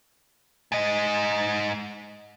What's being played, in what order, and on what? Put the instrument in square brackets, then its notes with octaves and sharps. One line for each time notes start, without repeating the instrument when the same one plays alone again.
[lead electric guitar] G#2 D#5